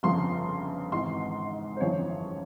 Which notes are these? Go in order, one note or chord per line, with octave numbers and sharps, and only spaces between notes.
G1 F2 C#3 F3 C6
G#1 G#2 E3 C6
C5
G1 F2 C#3 E3 C#5